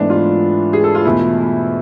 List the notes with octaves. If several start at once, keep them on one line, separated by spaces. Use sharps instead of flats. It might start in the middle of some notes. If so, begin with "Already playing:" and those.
Already playing: G#2 E3 A3 B3 D4
F4
G#4
A4
F4
E2 B2 A3 E4